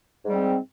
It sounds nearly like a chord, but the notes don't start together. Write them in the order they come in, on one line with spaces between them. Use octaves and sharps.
G#2 G3 C4